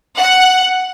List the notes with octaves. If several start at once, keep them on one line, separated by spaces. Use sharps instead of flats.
F#5